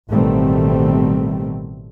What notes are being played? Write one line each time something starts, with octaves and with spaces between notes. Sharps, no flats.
A1 B2 D#3 G3 A3 C4